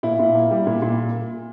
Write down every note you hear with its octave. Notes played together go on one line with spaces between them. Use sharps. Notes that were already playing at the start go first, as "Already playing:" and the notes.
A#2 E4
A#2
A#3
G3
A#2
A#2